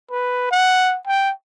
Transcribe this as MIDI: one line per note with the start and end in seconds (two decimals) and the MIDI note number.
0.11 0.50 71
0.51 0.98 78
1.07 1.32 79